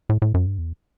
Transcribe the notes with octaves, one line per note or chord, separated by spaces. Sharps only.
A2
A2
F#2
G2
E2